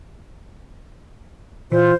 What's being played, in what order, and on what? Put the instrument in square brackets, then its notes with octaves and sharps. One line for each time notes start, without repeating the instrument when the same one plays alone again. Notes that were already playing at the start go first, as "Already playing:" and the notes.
[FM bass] A#2 [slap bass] E3 [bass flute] F4 [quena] C5